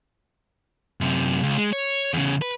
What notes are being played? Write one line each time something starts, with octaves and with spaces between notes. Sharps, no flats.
F#2 C3
C#2
G#3
C#5
E2 C#3
B4